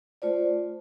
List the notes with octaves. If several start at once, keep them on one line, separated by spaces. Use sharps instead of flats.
A3 F4 C5 D5